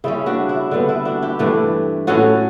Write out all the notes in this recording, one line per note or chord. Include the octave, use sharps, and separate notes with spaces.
C#3 G3 C#4 E4
D4 F#4
E4
D3 G3 B3 D4
E4
D4 F#4
E4 G4
G2 E3 A3 D4
A2 F#3 C#4 F#4 A4